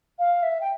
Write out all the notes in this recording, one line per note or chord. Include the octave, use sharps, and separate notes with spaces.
F5
E5
G5